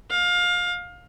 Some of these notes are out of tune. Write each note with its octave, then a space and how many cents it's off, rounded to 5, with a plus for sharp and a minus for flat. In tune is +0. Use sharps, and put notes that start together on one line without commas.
F5 +25